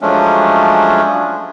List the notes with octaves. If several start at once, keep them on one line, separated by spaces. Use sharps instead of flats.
F3 F#3 G#3 A3 C#4 D4